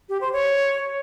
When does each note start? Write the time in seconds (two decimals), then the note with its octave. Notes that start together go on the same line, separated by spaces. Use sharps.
0.09 G4
0.21 C5
0.33 C#5